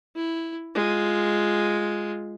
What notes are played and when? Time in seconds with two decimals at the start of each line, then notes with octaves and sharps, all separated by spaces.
0.16 E4
0.75 G#3 F4